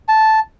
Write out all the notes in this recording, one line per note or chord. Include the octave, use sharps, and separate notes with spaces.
A5